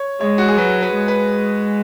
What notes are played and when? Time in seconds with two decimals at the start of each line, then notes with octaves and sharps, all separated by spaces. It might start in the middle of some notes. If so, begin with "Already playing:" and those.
Already playing: C#5
0.20 G#3 C#5
0.38 F#4
0.48 G#4
0.57 F#3 B4
0.82 B4
0.95 G#3
1.08 B4